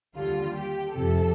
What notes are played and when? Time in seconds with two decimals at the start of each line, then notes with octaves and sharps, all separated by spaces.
0.14 D#2 D3 G3 F4
0.55 G4
0.94 F2 C3 F3 A4